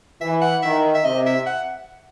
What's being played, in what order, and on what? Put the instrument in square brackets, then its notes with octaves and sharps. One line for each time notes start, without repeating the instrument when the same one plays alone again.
[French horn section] E3 [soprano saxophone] E5
[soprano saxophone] F#5
[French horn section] D#3 [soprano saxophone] E5
[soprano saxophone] E5
[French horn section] C3 [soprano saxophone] D#5
[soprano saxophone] E5
F#5